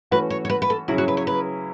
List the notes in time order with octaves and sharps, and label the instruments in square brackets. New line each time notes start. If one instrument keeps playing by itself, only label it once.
[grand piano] E3 A3 C#4 F#4 [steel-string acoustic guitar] B4
[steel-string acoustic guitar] C#5
C#5
B4
B4
A4
[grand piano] C#3 F#3 C#4 E4 [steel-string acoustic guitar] F#4
[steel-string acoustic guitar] F#4
B4
C#5
B4